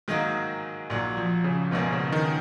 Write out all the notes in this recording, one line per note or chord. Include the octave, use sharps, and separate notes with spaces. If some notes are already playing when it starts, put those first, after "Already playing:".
G#2 D#3 F#3 G#3 A#3 D#4
A#1 A#2 F#3
F3
C#3
A#1 G#2 B2 F3 A#3 C#4
C#3
D#3